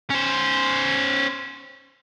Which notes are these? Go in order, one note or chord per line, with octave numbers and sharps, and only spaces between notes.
C#4 C5